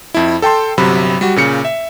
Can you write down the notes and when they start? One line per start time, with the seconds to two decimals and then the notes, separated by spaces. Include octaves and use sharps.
0.14 F2 E4
0.42 A4 G5 A5 C6
0.78 G1 C3 F#3 B5
1.21 G3 F#4
1.36 A#2 C#3 C#7
1.65 E5